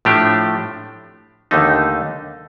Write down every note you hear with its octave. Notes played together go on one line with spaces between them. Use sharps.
A2 F3 A3 D4 G4
D#2 D3 A3 D#4